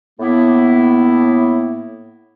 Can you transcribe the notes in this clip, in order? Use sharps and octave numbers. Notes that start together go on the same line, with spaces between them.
A2 A#3 B3 E4